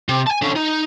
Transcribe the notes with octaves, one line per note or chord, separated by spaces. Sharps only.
C3
G#5 A5
D3 C#4
D#4